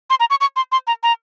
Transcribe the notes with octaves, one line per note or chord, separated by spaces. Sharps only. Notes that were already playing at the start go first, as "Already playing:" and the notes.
C6
A#5
C#6
C#6
C6
C6
A#5
A#5